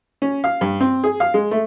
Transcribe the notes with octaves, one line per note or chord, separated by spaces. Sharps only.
C#4
F5
G2
C4
G#4
F5
G#3
A3